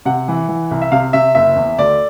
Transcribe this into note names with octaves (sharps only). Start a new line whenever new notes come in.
C3 F#5
E3
E3
C2
E5
C3 F5
C3 E5
F#1 E5
E2
D2 D5